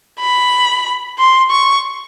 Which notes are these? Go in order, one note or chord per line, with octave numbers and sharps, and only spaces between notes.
B5
C6
C#6